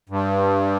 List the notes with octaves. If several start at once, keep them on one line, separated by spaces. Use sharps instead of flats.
G2